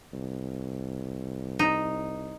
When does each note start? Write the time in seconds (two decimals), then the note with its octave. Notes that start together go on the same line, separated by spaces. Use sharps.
0.13 C2
1.59 D#4